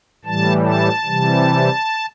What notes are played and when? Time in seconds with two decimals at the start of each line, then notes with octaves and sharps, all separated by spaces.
0.25 A2 E3 G3 A5
0.65 A5
1.05 C3 E3 G3